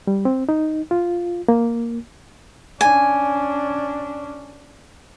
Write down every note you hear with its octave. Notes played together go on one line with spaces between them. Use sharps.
G3
C4
D#4
F4
A#3
C#4 D4 G#5